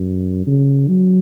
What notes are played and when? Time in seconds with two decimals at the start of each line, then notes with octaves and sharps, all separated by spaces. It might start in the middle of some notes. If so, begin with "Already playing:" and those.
Already playing: F#2
0.47 C#3
0.88 F#3